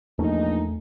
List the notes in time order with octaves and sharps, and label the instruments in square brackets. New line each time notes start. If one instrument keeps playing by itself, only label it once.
[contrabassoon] A#1 [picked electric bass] E2 A3 C#4 [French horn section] D#4